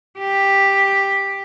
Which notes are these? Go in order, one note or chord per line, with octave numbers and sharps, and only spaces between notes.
G4